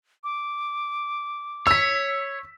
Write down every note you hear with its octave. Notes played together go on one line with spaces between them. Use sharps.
D6
C#5 E6 B6